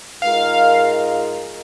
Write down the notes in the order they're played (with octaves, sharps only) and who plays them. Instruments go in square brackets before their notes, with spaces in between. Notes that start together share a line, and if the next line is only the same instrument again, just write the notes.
[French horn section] G#2 G#3 F4 A#4 D#5 [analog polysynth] F5